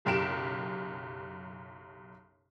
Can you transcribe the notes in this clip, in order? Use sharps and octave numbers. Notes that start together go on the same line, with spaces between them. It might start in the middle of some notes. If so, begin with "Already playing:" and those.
F#1 B1 F#2 G4 D7 E7